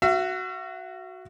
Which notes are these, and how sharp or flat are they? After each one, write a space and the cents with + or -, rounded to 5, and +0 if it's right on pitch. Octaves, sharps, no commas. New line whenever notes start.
F#4 +0 E5 +45